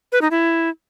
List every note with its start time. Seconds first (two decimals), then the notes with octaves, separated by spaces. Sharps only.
0.12 B4
0.22 D#4
0.31 E4